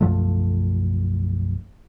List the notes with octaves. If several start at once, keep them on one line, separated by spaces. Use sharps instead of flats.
B1 F#2 F3 A3